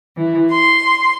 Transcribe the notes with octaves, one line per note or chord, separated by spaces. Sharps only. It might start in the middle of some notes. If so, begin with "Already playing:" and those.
E3
C6